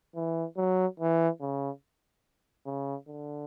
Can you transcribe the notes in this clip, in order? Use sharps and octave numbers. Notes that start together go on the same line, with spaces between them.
E3
F#3
E3
C#3
C#3
D3